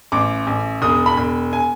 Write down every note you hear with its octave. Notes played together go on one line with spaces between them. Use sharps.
A1 D6
A1
E1 D#6
B5
E1
G#5